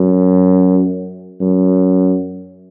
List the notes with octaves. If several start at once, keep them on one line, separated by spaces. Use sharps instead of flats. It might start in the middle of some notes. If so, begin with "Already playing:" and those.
Already playing: F#2
F#2